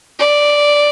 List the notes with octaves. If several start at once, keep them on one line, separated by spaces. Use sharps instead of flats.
D5